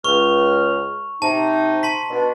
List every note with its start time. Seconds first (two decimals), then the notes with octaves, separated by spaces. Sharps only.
0.04 C#2 C#6 F6
1.22 C3 D#4 A5
1.83 A5 C6 B6
2.10 B2 D4